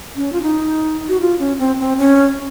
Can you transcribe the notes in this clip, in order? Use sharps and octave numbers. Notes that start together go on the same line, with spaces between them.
C#4
F4
D#4
F#4
F4
C#4
C4
C4
C#4